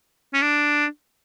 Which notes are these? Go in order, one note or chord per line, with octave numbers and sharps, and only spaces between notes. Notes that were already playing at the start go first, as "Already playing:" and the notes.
C#4
D4